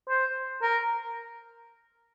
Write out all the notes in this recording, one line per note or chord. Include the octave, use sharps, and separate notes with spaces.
C5
A#4